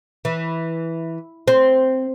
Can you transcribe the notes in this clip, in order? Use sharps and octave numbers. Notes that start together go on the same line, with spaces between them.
E3
C4